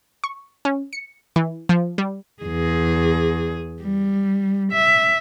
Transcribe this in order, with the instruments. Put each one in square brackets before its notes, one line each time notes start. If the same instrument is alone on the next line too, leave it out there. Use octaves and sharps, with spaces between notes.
[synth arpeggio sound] C#6
C#4
C#7
E3
F3
G3
[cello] E2 G#4
G3
E5